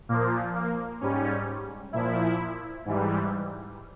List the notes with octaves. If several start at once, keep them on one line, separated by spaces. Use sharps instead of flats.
A#2 F3 A#3
A#3
G#2 G3 C#4
A#2 F3 E4
G#2 E3 G3